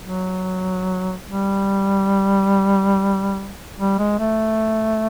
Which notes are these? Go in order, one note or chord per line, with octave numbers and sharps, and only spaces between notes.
F#3
G3
G3
G#3
A3